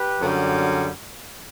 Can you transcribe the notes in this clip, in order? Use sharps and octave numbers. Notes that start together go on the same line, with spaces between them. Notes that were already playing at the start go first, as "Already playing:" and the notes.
Already playing: G4 B4
F#2 D3 G3